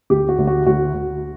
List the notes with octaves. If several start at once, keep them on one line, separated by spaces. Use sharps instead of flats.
D2 G4
F#4
D2
F#4
D2 F#4
D2